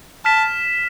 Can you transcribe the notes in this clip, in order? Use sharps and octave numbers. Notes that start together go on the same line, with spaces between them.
A5 F6 B6 E7